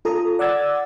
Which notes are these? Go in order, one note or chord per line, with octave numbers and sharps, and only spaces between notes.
F4 A4 A#5 D#6
D5 F#5 D6 E6 G#6 A6